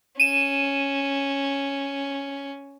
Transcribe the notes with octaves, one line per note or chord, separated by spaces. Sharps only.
C#4 D#7 E7